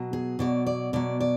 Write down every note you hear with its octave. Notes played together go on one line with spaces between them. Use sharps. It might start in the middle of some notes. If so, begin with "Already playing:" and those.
Already playing: B2 F#3
G#4
B2 F#3 D5
D5
B2 F#3 D5
D5